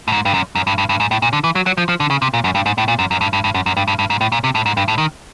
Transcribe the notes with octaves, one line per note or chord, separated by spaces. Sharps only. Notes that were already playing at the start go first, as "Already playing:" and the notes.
A2
G#2
G2
F#2
F#2
G2
G2
G2
G#2
A2
A#2
D3
E3
F#3
F#3
F3
F3
D3
C#3
C3
A#2
F#2
G2
G#2
A2
A#2
F#2
F#2
G2
G2
G2
F#2
F#2
G2
G2
G2
G#2
A2
A#2
C3
A2
G#2
G2
A2
D#3